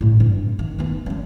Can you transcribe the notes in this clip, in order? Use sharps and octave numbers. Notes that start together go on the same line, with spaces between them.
A2 C#3
G2 C4
D#3
D#2 B3
G3 C#4